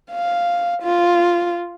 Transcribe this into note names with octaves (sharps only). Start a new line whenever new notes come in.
F5
F4